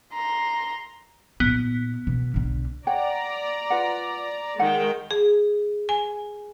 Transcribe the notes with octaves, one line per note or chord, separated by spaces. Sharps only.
A#5 C6
A#2 B3 D#4
B2
B1 D3
C#5 D5 F#5 G5 A#5
F4 B4 F#5
D#3 G#3 F#5 G5
G#4
G#5